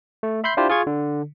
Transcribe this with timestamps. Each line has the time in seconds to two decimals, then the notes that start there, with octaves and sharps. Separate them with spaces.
0.23 A3
0.44 E5 B5 C6 G6 C7
0.57 D4 E4 F4 G4 C5
0.69 F4 G#4 C#6 G#6
0.87 D3